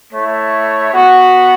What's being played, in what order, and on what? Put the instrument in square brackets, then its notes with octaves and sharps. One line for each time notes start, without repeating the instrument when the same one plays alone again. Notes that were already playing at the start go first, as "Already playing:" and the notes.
[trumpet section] A3 E4 C#5
B3 F#4